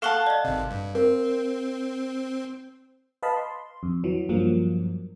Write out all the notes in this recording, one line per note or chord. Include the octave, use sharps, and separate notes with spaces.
A4 F5 F#5 A5 C#6 G7
D5 D#5
G#1 C3
G2
C4 A#4
B4 D#5 F5 A5 B5
C6
F2
E3 F#3
G2 F3 F#3 A#3